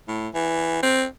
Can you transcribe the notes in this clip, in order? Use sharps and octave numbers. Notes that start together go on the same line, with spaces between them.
A2
E3
C4